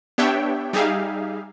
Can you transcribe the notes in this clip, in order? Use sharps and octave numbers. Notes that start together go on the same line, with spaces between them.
B3 D4 G4 C#5 E5 G5
G3 D#4 G4 G#4 E5 F5